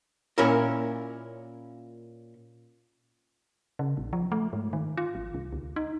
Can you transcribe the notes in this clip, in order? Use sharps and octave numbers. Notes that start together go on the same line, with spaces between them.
A#2 C#4 E4 A#4
C#3
A#1
F3
A3
G#2
D#3
F4
G#1
C2
D2
D#4